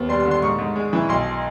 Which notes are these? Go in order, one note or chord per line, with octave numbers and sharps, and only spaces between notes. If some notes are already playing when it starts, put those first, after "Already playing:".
Already playing: D#2 B3
G3 C6
C6
D3
C6
G#2 C#6
G#2
G#3
E3
B1 C6